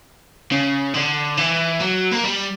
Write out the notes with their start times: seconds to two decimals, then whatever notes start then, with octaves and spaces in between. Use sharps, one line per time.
0.51 C#3
0.94 D3
1.37 E3
1.80 F#3
2.11 A#3
2.23 G3